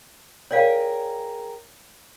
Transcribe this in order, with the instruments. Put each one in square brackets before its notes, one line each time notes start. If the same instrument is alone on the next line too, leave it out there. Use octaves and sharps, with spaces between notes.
[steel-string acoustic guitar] G#4 A#4 G5 [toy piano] C#5 D5 F5